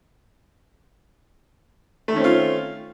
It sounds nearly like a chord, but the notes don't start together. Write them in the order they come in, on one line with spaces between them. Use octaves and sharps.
A3 D#3 C#4 C4 F4